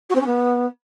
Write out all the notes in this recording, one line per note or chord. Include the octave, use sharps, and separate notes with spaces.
F#4
C4
C#4
B3